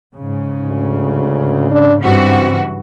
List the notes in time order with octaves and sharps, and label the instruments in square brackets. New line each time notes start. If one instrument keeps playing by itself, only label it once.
[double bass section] G#2 C#3
[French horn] D2
D4
[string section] G2 E3 F#4 [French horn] C4